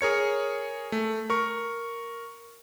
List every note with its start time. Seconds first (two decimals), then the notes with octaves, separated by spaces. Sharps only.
0.01 G#4 A#4 C#5 C#7
0.92 A3
1.30 A#4 C#6